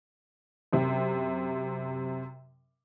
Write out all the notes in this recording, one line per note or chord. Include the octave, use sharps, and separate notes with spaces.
F#2 C3